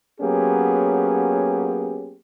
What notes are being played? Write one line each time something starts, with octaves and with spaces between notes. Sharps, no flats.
F#3 A#3 B3 C#4 G4 G#4